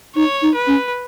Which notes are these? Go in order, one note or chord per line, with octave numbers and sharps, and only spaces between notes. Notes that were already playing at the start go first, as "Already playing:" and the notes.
D#4 C#5
D#4
B4
C#4